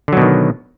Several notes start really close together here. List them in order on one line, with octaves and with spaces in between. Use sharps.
D3 F#3 B2 D#3